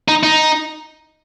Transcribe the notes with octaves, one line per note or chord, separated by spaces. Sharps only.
D#4
D#4